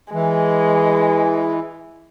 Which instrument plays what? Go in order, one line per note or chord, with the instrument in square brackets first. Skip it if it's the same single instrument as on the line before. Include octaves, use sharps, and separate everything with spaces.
[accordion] E3 [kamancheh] G#3